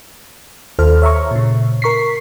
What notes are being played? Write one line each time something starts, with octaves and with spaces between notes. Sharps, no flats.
D#2 F4 A4 C5 F6
C#5 E5 A#5 C#6
A#2 C#3
A#4 C#6 B6 C7